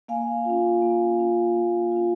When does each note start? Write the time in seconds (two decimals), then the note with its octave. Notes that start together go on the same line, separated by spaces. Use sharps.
0.08 A#3 F5 G#5
0.45 C#4 F4
0.82 A#3
1.19 C#4 F4
1.56 A#3
1.92 C#4 F4